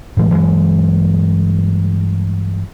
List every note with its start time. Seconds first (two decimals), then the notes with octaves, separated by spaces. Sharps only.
0.17 A2 E3 F3 G#3
0.30 G2 E3 F#3 G#3